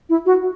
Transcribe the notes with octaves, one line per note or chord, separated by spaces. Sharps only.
E4
F#4